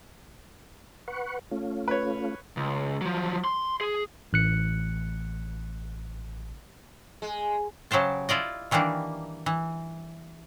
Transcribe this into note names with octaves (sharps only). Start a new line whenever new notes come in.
B4 F#5 C#6
A3 C#4 F4
B4 C#5
C#2
F3 F#3
C6
G#4
A1 F#6 C#7
G#3
C#3 F#3 G4 C5 A5
E4 F4 D5 D#5
D#3 E3 G3 A#3 D4
E3